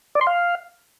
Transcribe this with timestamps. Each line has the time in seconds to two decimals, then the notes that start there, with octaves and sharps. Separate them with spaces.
0.15 D5
0.21 C6
0.27 F5